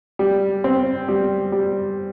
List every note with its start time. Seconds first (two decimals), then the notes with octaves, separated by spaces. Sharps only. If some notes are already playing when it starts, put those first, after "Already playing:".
0.19 G3
0.64 C4
1.08 G3
1.52 G3